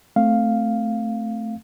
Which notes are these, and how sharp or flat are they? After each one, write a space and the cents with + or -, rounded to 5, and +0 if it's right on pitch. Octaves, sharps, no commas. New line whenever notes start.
A3 +0 C4 +0 F5 +0